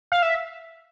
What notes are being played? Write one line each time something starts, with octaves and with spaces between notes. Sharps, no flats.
F5
E5